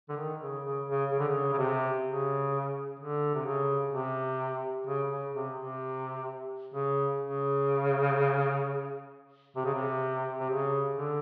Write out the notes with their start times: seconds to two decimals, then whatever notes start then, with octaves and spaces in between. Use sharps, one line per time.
0.09 D3
0.17 D#3
0.41 C#3
0.64 C#3
0.88 C#3
1.12 C#3
1.19 D3
1.28 C#3
1.53 C#3
1.58 C3
2.05 C#3
2.99 D3
3.34 C3
3.45 C#3
3.93 C3
4.87 C#3
5.10 C#3
5.34 C3
5.57 C3
6.74 C#3
7.21 C#3
9.56 C3
9.65 C#3
9.74 C3
10.39 C3
10.50 C#3
10.97 D3